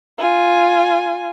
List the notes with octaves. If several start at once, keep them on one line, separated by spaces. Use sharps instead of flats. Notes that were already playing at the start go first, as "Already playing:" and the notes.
F4 G#5